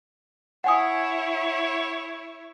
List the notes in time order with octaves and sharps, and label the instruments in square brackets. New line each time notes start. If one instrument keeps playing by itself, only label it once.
[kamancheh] E4 C#5 [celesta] F#5 G#5 D#6